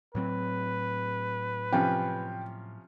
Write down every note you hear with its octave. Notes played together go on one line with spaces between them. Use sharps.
A2 F#3 C4 B4
C3 F3 C#4 G5